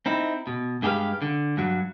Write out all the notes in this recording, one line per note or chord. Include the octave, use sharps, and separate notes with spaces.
C4 D#4 E4
B2
G2 G#3 G4 A4 B4 F5
D3
G2 F#3